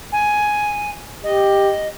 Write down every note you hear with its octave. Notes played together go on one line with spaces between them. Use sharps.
G#5
G4 D#5